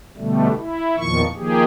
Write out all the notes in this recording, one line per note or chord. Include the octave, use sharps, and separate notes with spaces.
B2 D3 G3 A3
E4
E2 A#2 D#3 F3 C#6
D#3 F3 A#3 G4 G#4